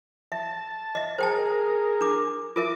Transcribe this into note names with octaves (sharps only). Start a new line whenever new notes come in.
E5 A5
D#5 E5
G#4 A#4 C5 G5 A5
D4 D6
F4 A#4 E5 D6